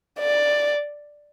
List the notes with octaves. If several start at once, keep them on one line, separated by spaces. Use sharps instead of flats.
D5